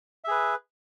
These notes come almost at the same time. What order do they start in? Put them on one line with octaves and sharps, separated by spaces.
E5 G#4 B4